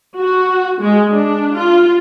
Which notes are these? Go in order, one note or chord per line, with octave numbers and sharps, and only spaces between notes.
F#4
G#3
D4
F4